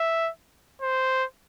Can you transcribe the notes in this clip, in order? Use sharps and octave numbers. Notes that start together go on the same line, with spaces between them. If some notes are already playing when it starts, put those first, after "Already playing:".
Already playing: E5
C5